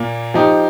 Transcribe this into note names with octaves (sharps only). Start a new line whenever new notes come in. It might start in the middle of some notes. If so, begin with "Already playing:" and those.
Already playing: A#2 A#3
F3 D#4 G4